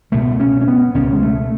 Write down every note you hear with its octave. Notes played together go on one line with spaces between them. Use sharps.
C#2 B2 A3
C#4
C#4
B3
C#2 B2 C#4
G#3
A3